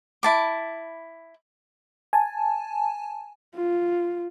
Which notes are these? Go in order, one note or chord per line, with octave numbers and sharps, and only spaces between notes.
E4 A5 D6
G#5 A5
F4